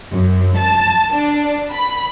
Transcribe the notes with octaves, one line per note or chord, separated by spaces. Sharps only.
F#2
A5
D4
B5